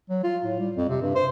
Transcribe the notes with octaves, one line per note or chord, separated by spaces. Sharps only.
F#3
F4
A2
G3
F2
C3
G2
C5